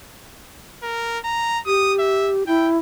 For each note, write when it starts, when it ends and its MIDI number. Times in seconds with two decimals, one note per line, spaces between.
0.83 1.19 70
1.24 1.59 82
1.66 2.43 67
1.66 1.93 87
1.99 2.33 76
2.47 2.79 64
2.47 2.68 79